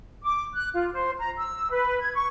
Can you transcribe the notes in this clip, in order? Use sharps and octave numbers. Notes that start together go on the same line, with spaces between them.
D6
F#6
F4
C5
A#5
E6
B4
G#6
C#6